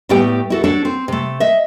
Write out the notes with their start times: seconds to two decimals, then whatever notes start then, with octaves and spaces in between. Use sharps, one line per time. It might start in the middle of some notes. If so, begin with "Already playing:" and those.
0.09 A2 G3 A3 B3 G4 G5
0.50 E4 F#4 A4
0.64 D4 F#4 A4 C#5
0.85 C4
1.08 C3 A3
1.40 D#5 E5